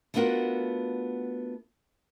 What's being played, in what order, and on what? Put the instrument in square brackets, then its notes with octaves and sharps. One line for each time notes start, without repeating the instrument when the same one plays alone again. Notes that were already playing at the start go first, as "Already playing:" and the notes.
[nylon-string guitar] A3 B3 D4 F4 F#4 A#4